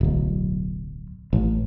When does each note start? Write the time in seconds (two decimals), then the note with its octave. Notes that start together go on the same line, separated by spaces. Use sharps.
0.01 D1 B1
1.33 A1